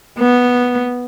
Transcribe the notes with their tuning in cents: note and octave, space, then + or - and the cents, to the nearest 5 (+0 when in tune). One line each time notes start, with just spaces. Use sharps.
B3 -5